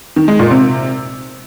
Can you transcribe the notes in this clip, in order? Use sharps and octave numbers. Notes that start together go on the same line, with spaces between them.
D#3
G#3
A#2
C3